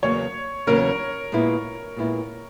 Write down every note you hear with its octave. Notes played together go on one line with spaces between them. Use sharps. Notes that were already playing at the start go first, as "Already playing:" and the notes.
E2 C#3 F#3 A#3 C#4 C#5
E2 C#3 F#3 A#3 C#4 A#4
A#2 G#3 B3 E4
A#2 G#3 B3 E4